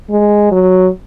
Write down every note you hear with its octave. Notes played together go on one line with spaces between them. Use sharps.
G#3
F#3